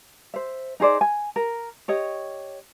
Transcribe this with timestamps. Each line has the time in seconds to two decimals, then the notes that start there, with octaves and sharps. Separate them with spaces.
0.34 C5 E5
0.80 D#4 G#4 C5 D5
1.01 G#5
1.36 A#4
1.88 G4 C#5 D#5